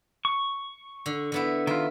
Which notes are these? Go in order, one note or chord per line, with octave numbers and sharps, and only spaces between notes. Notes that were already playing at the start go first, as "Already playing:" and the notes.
C#6
D3
D3 B3 E4
D#3 E4 F4